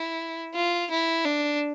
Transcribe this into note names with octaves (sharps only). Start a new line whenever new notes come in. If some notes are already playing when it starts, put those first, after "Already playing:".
Already playing: E4
F4
E4
D4